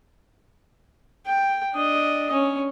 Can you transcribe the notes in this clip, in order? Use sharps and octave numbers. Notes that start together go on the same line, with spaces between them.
G5
D4 D#5
C#4